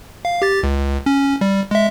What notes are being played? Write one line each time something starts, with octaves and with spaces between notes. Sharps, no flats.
F5
G4 A6
C#2
C#4
G3
G#3 E5